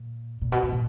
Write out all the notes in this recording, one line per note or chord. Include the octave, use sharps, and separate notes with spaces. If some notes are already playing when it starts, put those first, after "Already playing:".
Already playing: A#2
A#2
B2
A2
A#2